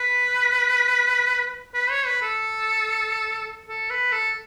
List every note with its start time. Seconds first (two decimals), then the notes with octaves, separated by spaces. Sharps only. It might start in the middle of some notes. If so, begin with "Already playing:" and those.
Already playing: B4
1.74 B4
1.91 C#5
2.06 B4
2.22 A4
3.68 A4
3.90 B4
4.12 A4